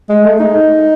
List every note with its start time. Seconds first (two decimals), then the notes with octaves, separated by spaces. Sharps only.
0.09 G#3
0.24 A3
0.40 D#4